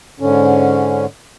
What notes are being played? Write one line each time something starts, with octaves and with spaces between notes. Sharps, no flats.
G#2 D3 C#4